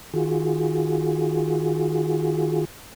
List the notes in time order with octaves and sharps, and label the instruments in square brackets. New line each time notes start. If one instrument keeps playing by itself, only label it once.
[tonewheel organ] D#3 F4 F#4 G#4